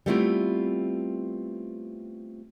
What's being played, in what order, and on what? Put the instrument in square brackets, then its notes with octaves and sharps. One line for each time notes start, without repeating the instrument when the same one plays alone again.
[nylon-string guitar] G3 A3 B3 C4 E4 F4